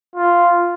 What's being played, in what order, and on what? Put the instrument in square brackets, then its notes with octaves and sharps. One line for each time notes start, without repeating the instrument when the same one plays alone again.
[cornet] F4